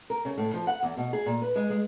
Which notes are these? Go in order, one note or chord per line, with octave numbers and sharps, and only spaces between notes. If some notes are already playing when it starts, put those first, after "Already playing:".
A#4
C#3
A2
F3
F#5
E2
B2
G#4
A#2
B4
G#3
G#3